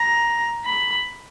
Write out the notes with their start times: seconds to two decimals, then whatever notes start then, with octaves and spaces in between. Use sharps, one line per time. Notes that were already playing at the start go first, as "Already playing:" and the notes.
Already playing: A#5
0.65 B5